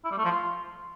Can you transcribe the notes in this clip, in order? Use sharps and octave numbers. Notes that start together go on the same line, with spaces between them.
E4
G3
A3
F3
F4